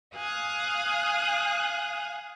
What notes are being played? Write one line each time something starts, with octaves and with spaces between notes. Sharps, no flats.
F5 G#5 D#6 F#6